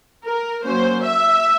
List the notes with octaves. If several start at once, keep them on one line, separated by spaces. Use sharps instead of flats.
A#4
F#3 A#3 C#4 C5
E5